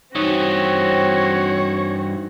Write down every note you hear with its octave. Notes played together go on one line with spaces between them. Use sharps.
G2 E3 C4 D#4 F#4 C#5